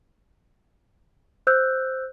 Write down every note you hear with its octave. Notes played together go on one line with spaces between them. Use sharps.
C5 E6 F#6 G6